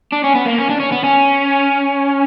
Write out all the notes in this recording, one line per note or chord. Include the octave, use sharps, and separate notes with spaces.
D4
C#4
B3
A#3
C#4
D4
C#4
B3
C#4